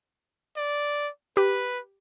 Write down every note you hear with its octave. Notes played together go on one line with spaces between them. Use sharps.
D5
G4 B4